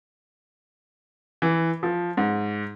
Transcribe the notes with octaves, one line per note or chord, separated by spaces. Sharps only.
E3
F3
G#2